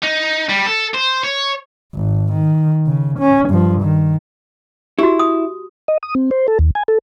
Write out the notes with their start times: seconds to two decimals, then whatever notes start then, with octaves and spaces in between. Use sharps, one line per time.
0.03 D#4
0.49 G3
0.66 A4
0.94 C5
1.24 C#5
1.94 G#1
2.33 D#3
2.86 C#3
3.19 C#4
3.49 G2 F3
3.82 D#3
4.99 E4 F#4 G4
5.19 D#6
5.88 D#5
6.03 D#6
6.15 C4
6.31 C5
6.48 A4
6.59 D#2
6.75 G#5
6.88 A4